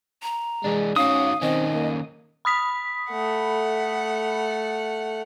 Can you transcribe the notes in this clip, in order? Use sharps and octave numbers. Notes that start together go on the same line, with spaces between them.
A#5
E3 G#3 D4
D#3 C#4 F#4 F5 D#6
D#3 C4 C#4 D#5
A#3
B5 D#6 B6
A3 F#5